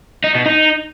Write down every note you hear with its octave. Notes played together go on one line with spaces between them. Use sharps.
D#4
B2
D#4